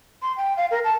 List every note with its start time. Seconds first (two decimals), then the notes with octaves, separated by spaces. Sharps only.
0.22 C6
0.37 G5
0.57 F5
0.71 A#4
0.84 A5